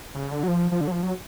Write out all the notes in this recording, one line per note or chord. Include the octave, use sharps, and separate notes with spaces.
C#3
D3
F#3
F3
F3
D3
F#3
F3
F#3